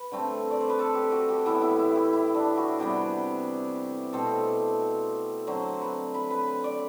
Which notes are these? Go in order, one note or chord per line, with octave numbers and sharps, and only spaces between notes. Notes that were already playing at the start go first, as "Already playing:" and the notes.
Already playing: B4
D3 A3 C4
D5
C5
B4
A4
G4
F#4
G4
A2 E3 B3 E4
E4
E4
G4
E4
D4
F#4
C3 E3 G3 B3 G4
B2 A3 C4 A4
D3 F#3 C4 C5
B4
B4
B4
B4
D5